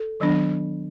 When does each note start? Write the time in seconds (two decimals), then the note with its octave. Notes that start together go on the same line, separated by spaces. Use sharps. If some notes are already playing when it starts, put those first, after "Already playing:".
Already playing: A4
0.20 D#3 F#3 B3 D4